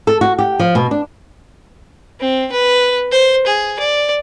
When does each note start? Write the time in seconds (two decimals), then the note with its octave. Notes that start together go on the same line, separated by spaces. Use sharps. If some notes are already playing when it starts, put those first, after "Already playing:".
0.07 A4
0.21 F#4
0.39 G4
0.59 F3
0.75 B2
0.91 D4
2.20 C4
2.52 B4
3.12 C5
3.47 G#4
3.80 D5